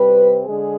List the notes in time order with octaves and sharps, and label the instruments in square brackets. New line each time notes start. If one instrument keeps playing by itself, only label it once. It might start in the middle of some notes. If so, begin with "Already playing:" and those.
Already playing: [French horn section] C3 G3 C4 B4
D3 G#3 G#4